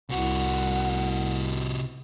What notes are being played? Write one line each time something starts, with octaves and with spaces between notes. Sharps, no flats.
C2 C3 F#4 F#5